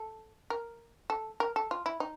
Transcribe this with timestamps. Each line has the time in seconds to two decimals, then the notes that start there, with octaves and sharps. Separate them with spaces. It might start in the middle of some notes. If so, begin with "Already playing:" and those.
Already playing: A4
0.50 A#4
1.10 A4
1.40 A#4
1.56 A4
1.71 F4
1.86 E4
2.00 D#4